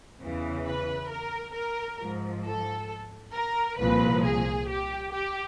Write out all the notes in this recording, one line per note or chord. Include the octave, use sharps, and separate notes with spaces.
E2 C#3 E3
B4
A#4
A#4
G#2 F3
A4
A#4
C2 A#2 F3 B4
G#4
G4
G4